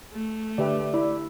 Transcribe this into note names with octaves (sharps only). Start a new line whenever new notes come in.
A3
D3 G4 B4 D5 E5
E4 D5